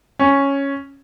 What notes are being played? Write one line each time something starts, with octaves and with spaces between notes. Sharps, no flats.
C#4